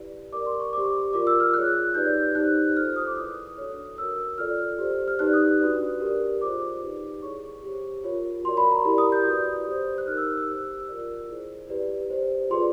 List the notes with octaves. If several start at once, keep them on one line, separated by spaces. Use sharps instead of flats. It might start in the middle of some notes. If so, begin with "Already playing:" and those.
Already playing: E4 G4 B4 D5
G4 A#4 D5 D6
C6
C#6
G4 C5 D6
F4 A#4 D5 D6
E6
F6
F4 G#4 C#5 F#6
D#4 G4 B4 D5 G6
D#4 G4 C5 F#6
F4 A4 C5 F6
D#6
D6
E4 G#4 B4 D5 D#6
D4 F#4 A4 C#5
F#4 A#4 C#5 E6
F4 A4 D5 F6
G4 C5
F6
D#4 G4 B4 D5 F#6
D#6
D4 F#4 B4 D5
G4 A#4 D5
F4 G#4 C5 D6
D#4 G4 B4 D5
E4 G#4 C#5 C#6
G4
C5
F4 A#4 C#5
F#4 A#4 D5 C6
B5
A#5
E4 G4 A#4 D5
D#6
G6
F#4 B4 D5
G4 C5
F#6
D#4 G4 A#4 F6
E6
E6
G4 C5
F4 A#4 D5
E4 G#4 C5
E4 G4 B4 D5
G4 C5
F4 G#4 B4 D5 C6